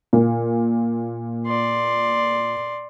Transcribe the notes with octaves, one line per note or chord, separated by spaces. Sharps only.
A#2
D5 C6